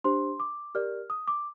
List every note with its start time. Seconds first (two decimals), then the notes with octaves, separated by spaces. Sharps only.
0.04 D4 G4 C5 C6
0.40 D6
0.75 G4 A#4 D5 F6
1.10 D#6
1.28 D6